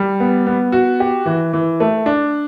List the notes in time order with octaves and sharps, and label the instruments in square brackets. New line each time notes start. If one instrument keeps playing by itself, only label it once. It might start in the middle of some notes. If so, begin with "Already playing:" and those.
Already playing: [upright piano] G3
B3
B3
F#4
G4
E3
E3
A3
D4